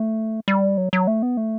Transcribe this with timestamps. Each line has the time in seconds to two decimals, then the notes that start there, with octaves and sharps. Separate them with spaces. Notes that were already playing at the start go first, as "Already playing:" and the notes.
Already playing: A3
0.48 G3
0.77 F#3
0.93 F#3
1.07 A3
1.22 B3
1.37 A3